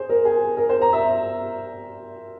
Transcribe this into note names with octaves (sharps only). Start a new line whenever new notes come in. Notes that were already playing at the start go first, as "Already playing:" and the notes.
Already playing: G#4 C5
A#4
G#4
A#4
C5
A#5
E5